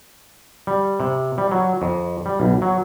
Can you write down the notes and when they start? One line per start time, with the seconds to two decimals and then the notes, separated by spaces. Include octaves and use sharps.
0.67 G3
1.00 C3
1.38 G3
1.51 F#3
1.82 F2
2.26 G3
2.40 B1
2.62 F#3